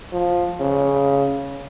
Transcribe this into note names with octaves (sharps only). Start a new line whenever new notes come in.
F3
C#3